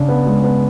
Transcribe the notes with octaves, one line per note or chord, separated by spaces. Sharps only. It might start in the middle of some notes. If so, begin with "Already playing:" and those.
Already playing: C#3 D4
B3
G#3
B3